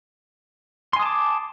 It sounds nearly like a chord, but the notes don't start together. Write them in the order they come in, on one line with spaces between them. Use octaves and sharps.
C6 G#5 D#6 A5 D6